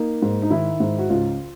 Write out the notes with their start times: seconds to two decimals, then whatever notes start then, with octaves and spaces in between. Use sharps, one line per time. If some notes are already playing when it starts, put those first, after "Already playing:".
Already playing: A#3 D#4
0.22 G#2
0.42 D#4
0.50 D#3 E4
0.80 G#2
0.98 F#4
1.10 C#2 F4